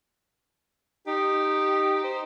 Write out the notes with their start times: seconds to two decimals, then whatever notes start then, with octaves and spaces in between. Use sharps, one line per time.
1.07 D#4 G4
2.04 C5